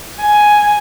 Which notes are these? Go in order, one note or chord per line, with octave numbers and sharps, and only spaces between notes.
G#5